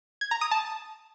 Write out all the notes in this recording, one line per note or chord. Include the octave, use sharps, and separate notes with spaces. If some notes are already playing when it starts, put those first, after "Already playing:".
G#6
A#5
D#6
A5